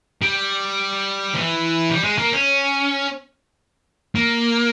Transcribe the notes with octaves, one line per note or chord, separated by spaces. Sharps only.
G3
E3
G3
G#3
A#3
C#4
A#3